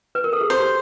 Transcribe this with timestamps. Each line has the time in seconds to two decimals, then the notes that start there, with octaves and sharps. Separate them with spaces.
0.15 B4
0.24 A#4
0.33 A4
0.41 G#4
0.50 G4 C5